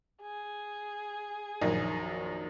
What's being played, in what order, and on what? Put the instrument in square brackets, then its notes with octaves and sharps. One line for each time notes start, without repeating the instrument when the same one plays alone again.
[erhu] G#4
[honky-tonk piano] A#1 F#2 D#3